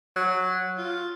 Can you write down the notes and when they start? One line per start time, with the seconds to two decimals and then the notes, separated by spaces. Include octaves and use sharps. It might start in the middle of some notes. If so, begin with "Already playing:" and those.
0.16 F#3
0.78 F4